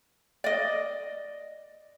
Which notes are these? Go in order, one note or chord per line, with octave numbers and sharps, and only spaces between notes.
D5 D#5